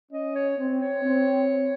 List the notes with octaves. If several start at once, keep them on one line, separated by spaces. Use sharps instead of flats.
C#4 D#5
C#5
C4
C#5
C4